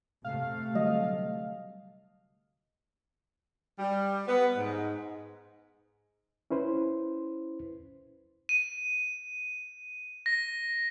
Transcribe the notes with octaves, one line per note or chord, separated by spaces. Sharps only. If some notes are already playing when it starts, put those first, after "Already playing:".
C3 A3 F5
D3 F#3 G3 D#5
G3
B3
G#2
C#4 E4 B4 C5
D#7
A#6